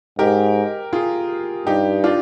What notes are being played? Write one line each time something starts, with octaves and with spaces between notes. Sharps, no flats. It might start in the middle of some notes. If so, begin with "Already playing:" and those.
G#2 G4 A#4
F4 G#4
G2 D#4 G4
D4 F4